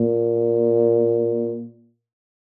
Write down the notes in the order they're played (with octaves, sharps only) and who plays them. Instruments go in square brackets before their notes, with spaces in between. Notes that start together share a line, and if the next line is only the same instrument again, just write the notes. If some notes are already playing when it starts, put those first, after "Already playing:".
Already playing: [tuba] A#2